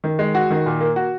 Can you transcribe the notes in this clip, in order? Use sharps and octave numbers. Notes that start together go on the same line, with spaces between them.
D#3
G#3
F#4
D#3
A#2
A#3
F#4